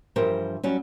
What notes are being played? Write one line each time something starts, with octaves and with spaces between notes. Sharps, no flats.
G2 E3 F3 G4 A#4 C5
F#3 G3 C#4